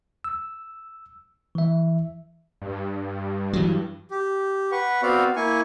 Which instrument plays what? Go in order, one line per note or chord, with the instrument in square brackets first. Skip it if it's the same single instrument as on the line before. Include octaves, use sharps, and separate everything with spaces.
[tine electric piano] E6
E3 E5
[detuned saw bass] G2
[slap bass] E3 F#3
[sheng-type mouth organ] G4
B4 F#5 C#6
B3 C4 F#4 D5 F5
A#3 E4 G#5 C#6